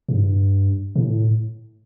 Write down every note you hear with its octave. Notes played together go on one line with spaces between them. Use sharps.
G2
A2